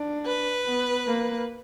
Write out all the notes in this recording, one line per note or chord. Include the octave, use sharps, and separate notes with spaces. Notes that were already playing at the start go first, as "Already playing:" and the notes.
Already playing: D4
B4
B3
A#3